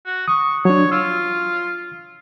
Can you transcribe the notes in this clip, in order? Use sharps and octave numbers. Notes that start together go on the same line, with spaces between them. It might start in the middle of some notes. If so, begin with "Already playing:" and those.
F#4
C#6 D#6
F#3 D4 C#5
F4 E6